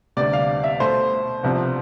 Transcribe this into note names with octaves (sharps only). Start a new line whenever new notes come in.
D2 C3 G3 B3 D5
F5
E5
B2 A3 C5
C2 C3 F3 B3